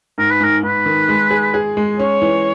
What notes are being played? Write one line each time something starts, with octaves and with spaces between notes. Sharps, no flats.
G#2 A#4
B4
G#2 A#4
G#2 B4
D#3
G#3
G#4
G#4
G#3
C#4 C#5
E3